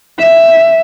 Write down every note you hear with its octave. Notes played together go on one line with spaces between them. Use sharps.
E5